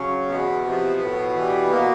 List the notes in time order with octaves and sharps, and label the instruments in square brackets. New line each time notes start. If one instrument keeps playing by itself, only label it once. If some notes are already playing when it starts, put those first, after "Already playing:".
Already playing: [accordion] C#3 F#3 C#4
E2 B2 B3
C3 F3
A2
E3 G3
B2 A#3